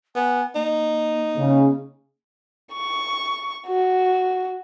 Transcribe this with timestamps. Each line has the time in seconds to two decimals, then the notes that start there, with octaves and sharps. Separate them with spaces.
0.16 B3 G#5
0.55 A#3 D#4
1.38 C#3
2.73 C#6
3.67 F#4